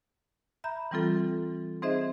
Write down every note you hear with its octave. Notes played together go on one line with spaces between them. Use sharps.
E5 A#5 B5 G6
E3 G3 C4 F4 A4
C4 D#4 G#4 C5 D#5 E5